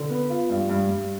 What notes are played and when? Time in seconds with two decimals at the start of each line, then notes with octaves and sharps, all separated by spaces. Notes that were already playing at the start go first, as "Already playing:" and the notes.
Already playing: D3
0.10 B3
0.30 F4
0.50 G2
0.69 G2
0.89 G2